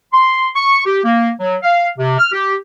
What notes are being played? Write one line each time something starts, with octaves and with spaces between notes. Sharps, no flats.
C6
C#6
G4
A#3
F#3
F5
C3
F6
G4